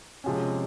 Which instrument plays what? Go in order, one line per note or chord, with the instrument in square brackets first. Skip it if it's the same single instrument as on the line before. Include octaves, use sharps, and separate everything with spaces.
[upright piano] C3 F3 G#3 C#4